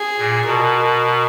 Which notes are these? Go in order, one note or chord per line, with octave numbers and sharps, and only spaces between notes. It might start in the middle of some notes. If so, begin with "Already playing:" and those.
Already playing: G#4
A#2
B2 A#4